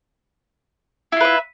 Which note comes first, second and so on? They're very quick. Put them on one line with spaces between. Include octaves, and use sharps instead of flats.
E4 F4 B4 E5